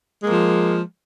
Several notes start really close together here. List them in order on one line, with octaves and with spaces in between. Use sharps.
G#3 A#3 F3